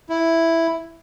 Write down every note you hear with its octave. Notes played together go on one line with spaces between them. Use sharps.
E4